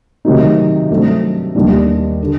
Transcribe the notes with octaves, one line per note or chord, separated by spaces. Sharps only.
C3 D#3 F#3 A3 D#4
G2 F#3 A3 C4
D#2 D#3 G3 A#3 D4
D3